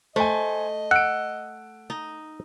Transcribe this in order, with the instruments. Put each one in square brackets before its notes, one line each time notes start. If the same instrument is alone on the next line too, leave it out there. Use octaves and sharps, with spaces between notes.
[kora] A3 [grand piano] C5 G#5 [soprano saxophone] D#5
[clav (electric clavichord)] F#5 [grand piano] E6 D7
[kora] D#4